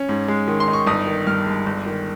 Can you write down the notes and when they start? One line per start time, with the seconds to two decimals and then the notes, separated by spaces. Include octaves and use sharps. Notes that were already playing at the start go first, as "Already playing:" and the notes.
Already playing: C#4
0.09 G#2
0.28 G#3
0.48 D#3
0.60 C6
0.68 D#4
0.73 C#6
0.87 G1 D#6
1.07 D#3
1.27 G2 F6
1.46 G#3
1.66 G1
1.86 D#3